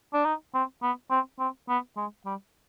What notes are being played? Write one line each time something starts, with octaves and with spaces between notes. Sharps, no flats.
D4
D#4
C4
B3
C4
C4
B3
G#3
G3